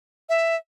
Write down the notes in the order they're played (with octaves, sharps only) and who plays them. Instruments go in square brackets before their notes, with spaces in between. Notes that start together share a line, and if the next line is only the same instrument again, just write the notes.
[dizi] E5